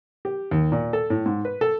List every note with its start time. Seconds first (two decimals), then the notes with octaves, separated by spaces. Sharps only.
0.25 G4
0.51 D#2
0.72 A#2
0.93 A4
1.10 A2
1.26 G#2
1.45 B4
1.61 A4